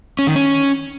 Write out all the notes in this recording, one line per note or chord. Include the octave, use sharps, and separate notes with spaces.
C#4
D#3
C#4